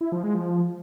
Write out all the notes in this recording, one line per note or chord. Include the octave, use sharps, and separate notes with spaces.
E4
F3
G#3
F3